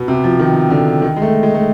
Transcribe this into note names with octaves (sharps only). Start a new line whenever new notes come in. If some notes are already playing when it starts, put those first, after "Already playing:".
Already playing: B2
C3
F3
D#3
D3
D#3
G#3
A3
G#3
A3